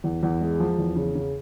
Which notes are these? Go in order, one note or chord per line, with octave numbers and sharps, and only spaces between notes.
E2
E2
G#3
F3
E2
C#3
C#3